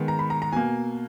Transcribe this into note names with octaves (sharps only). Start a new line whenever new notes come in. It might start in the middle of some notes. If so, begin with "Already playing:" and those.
Already playing: D#3 G#3 B3
A#5
B5
A#5
A#5
B2 A#3 G#5